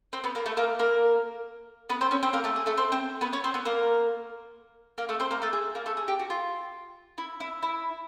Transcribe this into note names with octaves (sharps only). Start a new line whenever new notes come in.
C4 C5
B3 B4
A#3 A#4
A3 A4
A#3 A#4
A#3 A#4
B3 B4
C4 C5
C#4 C#5
C4 C5
A#3 A#4
A3 A4
G#4
A3 A4
C4 C5
C4 C5
B3 B4
C#4 C#5
C4 C5
B3 B4
A#3 A#4
A#3 A#4
A3 A4
C4 C5
A#3 A#4
A3 A4
G#4
A#3 A#4
A3 A4
G#4
G4
F#4
F4
E4
E4
E4